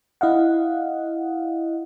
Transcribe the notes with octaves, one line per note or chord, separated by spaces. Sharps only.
E4 D#5 F5 F#5